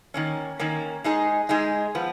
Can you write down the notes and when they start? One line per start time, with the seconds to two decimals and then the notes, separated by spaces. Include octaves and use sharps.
0.14 D#3 A#3 C#4
0.60 D#3 A#3 C#4
1.04 G#3 D#4 G#4
1.49 G#3 D#4 G#4
1.95 F3 B3